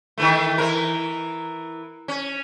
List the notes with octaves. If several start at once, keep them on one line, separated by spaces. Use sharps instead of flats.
D#3 E3 A3
E3 A#4
C#4